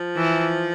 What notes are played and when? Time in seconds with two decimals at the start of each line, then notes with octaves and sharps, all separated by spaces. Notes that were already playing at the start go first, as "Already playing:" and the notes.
Already playing: F3
0.16 E3